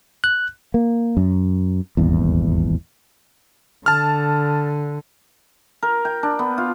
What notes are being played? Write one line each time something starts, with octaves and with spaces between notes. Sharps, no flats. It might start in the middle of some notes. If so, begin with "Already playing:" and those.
F#6
A#3
F#2
D#1 G#1 E2
D3 A5 F6
A#4
G5
D4
B3
F4